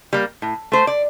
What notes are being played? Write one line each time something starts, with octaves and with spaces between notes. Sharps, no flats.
G3 A#3
A2
A3 C5
D5